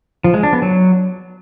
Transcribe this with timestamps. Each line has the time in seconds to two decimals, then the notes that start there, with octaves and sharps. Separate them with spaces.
0.24 F3
0.34 G#3
0.43 D4
0.53 B3
0.62 F#3